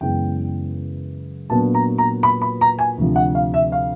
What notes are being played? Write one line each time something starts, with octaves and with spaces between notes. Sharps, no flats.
F#2 C#3 E3 G#3 B3 G5
A#2 F#3 B3 D4 A5
A#5
A#5
B5
B5
A#5
G#5
D2 C3 F3
F#5
F5
E5
F5